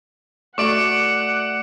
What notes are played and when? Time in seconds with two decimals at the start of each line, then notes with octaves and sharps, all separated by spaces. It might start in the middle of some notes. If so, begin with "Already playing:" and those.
0.58 A3 F#4 D5 F#5 C#6 D6 D7 F#7